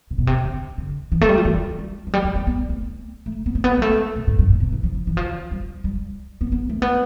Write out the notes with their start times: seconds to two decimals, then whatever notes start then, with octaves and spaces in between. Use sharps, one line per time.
0.11 C3
0.18 B2
0.27 C3
0.45 D3
0.78 D3
1.12 E3
1.21 A3
1.29 G3
1.38 F3
1.45 E3
1.79 G3
2.07 F3
2.14 G3
2.24 G3
2.35 G3
2.47 B3
2.69 A3
3.26 A3
3.46 B3
3.55 A3
3.64 B3
3.77 G3
3.82 A3
4.16 B2
4.27 A2
4.39 G2
4.50 A2
4.60 B2
4.72 E3
4.83 F3
5.07 E3
5.17 F3
5.51 G3
5.84 G3
6.41 B3
6.52 B3
6.69 A3
6.82 B3